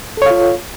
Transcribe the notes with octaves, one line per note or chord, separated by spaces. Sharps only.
F4 A4 C#5 F5